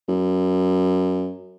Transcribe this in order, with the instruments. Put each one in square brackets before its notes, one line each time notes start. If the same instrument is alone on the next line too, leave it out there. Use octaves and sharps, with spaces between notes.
[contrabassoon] F#2